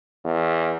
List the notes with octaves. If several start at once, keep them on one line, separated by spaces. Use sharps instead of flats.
E2